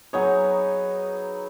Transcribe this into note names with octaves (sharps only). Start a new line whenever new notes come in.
F#3 B3 D#4 G#4 C#5